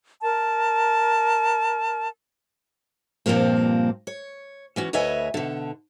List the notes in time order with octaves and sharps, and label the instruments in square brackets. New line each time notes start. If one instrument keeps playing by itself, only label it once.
[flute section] A#4 A5
[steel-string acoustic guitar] G2 A#2 C#3 F3 A#3 C4
C#5
E3 C#4 F#4
D2 B4 C#5 D#5 E5 G#5
B2 D3